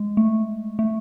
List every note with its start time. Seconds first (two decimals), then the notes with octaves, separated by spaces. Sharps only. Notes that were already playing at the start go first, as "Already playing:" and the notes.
Already playing: G#3
0.17 A3
0.79 A3